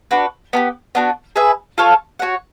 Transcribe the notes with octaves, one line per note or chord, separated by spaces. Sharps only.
D4 F#4 B4
B3 D4 G4
B3 D4 F#4
G#4 B4 E5 G#5
F4 A4 C#5 F5
F#4 A#4 C#5 F#5